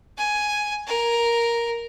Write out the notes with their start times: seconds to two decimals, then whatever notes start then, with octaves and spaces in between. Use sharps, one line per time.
0.18 G#5
0.87 A#4